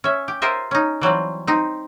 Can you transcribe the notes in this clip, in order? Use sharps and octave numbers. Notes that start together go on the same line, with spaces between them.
C#4 E5
G4
F4 A#4 C5 D#5 E5
C#4 D#4
E3 F#3 G3 C4
C4 D#4